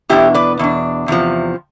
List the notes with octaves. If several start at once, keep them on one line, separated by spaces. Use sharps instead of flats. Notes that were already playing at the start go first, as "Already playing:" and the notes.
E2 B2 B3 D4 E4 G4
B4 D5
E2 B2 D4
E2 C3 F3